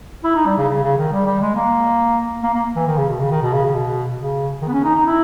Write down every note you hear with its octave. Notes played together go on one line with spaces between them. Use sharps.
E4
D#4
G3
C#3
C#3
C#3
D#3
G3
G3
G#3
A#3
A#3
A#3
E3
D#3
C#3
B2
C#3
D#3
B2
C#3
C#3
B2
C#3
D#3
B3
C#4
D#4
D#4
E4